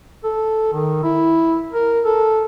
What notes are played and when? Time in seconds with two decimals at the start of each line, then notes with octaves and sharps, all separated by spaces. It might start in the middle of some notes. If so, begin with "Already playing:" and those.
0.24 A4
0.73 D#3
1.03 E4
1.73 A#4
2.05 A4